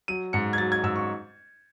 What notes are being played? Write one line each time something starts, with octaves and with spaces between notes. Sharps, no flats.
F#3 D#7
G#2 C#7
G#6
F#3 A6
G#6
G#2 E6
C#6